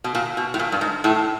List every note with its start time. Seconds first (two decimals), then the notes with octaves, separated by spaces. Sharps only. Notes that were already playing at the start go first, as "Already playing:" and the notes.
0.04 B2
0.15 A#2
0.37 B2
0.54 A2
0.59 A#2
0.72 G2
0.81 G#2
1.04 A2